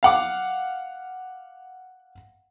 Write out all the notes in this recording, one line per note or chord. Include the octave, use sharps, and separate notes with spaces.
F5 F#5 D6